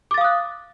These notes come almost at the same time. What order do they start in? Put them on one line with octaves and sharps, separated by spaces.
D6 A6 F5 D#6 F#6